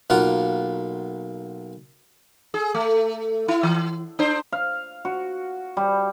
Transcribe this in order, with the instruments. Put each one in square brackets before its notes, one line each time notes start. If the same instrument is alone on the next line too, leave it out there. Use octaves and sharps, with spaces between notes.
[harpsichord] B1 A#3 F4 F#5
[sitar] G#4
A3
E4
E3
D4 C5
[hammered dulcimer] F5
F#4
G3